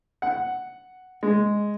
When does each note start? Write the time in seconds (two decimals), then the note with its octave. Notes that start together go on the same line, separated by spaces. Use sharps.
0.22 F#5
1.23 G#3